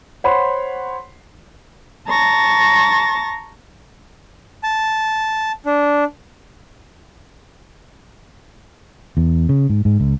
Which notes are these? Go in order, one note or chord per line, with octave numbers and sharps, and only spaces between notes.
C5 C#5 F#5 B5 C6
A5 A#5 C#6 A6 A#6
A5
D4
E2
C#3
G#2
G#2
C#2